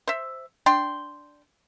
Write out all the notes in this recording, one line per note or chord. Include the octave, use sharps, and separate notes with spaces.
C5 E5
D4 G5 C6